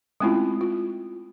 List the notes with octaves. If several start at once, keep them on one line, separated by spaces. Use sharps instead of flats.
G#3 A3 C4 C#4 E4 F4
F4